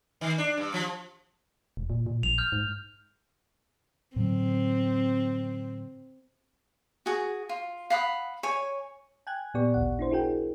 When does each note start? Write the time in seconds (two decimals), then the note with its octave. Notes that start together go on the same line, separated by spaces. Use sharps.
0.21 D#3
0.38 D4
0.58 G2
0.74 F3
1.77 E1
1.90 A#2
2.06 A#2
2.23 A#1 F7
2.38 F6 G6
2.52 G#2
4.16 A2 D3 F#3 C4
7.06 F#4 G#4
7.49 F4
7.90 F5 F#5 B5 D#6
8.43 C#5 G#5
9.27 G5 G#5 F#6 G#6
9.54 A#2 B3 G4 D5 C#6
9.74 A1 D2 F#5
9.99 D4 E4 C5
10.11 E4 F#4 G#4 A#4 G5